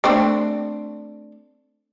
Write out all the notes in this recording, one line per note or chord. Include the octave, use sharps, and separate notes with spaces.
A3 C4 D4